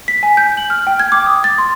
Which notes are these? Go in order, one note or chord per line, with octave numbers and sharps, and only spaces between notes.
B6
G#5
G6
F#7
F6
G5
G#6
D6
D#6
A6
C6